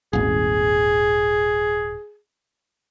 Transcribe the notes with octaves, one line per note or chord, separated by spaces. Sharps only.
D#1 G#1 G#4